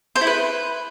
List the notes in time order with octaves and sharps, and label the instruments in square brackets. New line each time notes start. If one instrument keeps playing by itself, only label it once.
[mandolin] C5
E4
B4